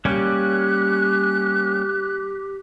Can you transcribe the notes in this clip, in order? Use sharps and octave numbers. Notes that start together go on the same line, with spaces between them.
G3 A#3 C#4 G4 F#6